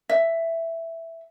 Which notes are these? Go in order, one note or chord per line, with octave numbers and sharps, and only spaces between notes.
E5